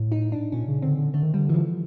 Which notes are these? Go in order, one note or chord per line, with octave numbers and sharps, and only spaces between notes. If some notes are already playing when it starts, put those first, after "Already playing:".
Already playing: A2
D#4
D4
A#2 C#4
C#3
D3 C4
D3
D3 A3
D#3
D3 G3
E3
F3